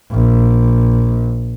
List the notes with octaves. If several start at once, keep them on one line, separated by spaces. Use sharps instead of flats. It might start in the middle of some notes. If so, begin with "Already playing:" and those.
A#1